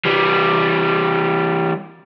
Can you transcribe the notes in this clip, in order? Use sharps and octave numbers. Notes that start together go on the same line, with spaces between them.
E3 G3